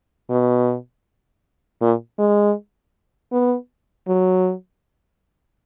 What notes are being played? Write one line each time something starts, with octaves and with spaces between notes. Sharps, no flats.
B2
A#2
G#3
B3
F#3